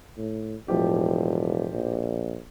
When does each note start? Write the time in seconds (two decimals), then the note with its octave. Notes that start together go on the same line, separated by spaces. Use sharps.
0.17 A2
0.68 E1 A2 F3 G4
1.72 A#1